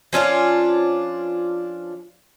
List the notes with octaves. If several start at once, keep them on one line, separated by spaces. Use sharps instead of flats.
F3 C#4 D4 F4